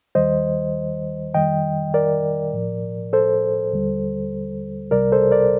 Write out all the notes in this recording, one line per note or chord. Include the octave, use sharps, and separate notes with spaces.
D#2 D#3 G3 C5 D#5
F2 D#3 G3 D#5 G5
A#4 D5
A2 F3
A4 C5
D#2 D3 G3
C2 C3 G3 A#4 D5
A4 C5
A#4 D5